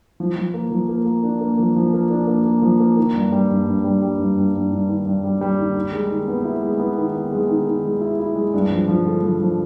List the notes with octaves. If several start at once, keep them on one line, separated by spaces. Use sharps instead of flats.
F3
F3
A#3
F3
A#3
A#3
D4
A#3
F3
F3
A#3
D4
A#3
A#3
F3
A#3
D#3
G2
G3
G2
G2
G3
G3
G2
G2
G2
G2
D#3
G2
G3
G3
D#3
D#3
G#3
D#3
B3
E4
G#3
B3
D#3
D#3
G#3
D#3
D#3
G#3
E4
E4
G#3
G2
F3
F3
D3
F3
F3